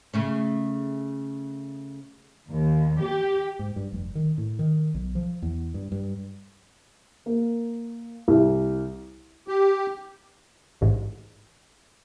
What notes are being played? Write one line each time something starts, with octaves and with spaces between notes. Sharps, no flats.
C#3 A3 C#4
D#2
G4
G#2
G2
F1
D#3
A2
D#3
B1
F3
E2
G2
G2
A#3
C2
G4
A1 G#2